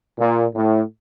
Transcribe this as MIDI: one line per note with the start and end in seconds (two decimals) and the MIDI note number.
0.18 0.45 46
0.55 0.81 45